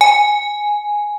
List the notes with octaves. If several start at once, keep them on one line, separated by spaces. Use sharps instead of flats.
G#5